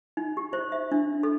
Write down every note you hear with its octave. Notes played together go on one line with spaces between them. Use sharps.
D#4
G4
C5
E5
D4
A4